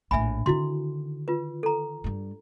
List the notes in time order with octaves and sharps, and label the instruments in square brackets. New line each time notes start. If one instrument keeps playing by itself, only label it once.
[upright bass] A#1 A2 [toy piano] E5 G#5 B5
[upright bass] D3 D#3 [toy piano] E4 F#4 C6
[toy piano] F4 B4
A4 A#5
[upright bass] G2 G3